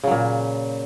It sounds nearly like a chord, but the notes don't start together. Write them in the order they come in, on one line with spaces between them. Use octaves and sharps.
C#3 F#3 A#2